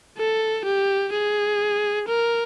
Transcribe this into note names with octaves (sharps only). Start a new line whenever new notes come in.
A4
G4
G#4
A#4